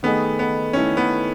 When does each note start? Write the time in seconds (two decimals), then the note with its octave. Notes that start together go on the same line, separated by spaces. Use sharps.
0.03 D#3 A3 B3 D#4 G#4
0.39 B3
0.73 D#3 A3 C#4 E4 A4
0.97 B3